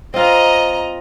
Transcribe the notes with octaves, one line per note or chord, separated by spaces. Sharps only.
C4 F4 D#5 A#5